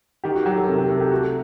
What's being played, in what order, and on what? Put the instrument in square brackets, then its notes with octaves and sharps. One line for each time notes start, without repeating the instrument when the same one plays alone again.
[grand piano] D#3 [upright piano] G4
[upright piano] F#4
[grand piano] F#3 [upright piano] G4
[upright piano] A4
[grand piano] C3 [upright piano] A#4
[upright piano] G4
[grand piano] C3 [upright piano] A4
[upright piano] G4
[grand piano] A3 [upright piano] F#4